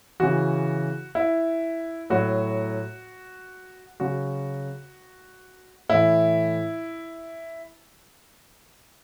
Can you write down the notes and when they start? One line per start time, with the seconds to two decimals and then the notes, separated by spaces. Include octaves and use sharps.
0.20 C#3 E3 F#4
1.15 E4
2.10 A2 F#3 F#4
4.00 C#3 F#3 F#4
5.89 A2 E3 E4